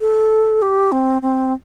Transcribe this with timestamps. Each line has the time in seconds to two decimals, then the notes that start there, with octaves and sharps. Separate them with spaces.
0.01 A4
0.62 G4
0.92 C4
1.22 C4